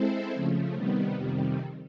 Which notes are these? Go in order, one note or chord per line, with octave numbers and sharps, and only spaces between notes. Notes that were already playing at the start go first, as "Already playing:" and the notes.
Already playing: G#3 C4 E4 A4 C5
C#3 F3 A3
C3 D#3 G3 B3
F2 C3 D#3 G3